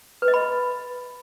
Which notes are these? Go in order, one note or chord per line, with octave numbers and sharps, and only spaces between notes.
B4
D#5
B5